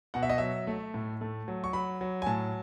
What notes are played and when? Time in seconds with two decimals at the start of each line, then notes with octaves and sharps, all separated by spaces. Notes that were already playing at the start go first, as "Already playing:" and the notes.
0.14 B2 F#5
0.23 E5
0.30 D#5
0.38 F#3 E5
0.67 A3
0.94 A2
1.21 A3
1.48 F#3
1.64 C#6
1.73 F#3 B5
2.01 F#3
2.22 G#5
2.26 A2 A5